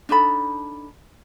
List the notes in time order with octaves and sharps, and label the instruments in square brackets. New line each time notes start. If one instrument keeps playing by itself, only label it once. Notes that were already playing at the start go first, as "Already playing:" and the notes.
[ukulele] D4 D#4 A4 B5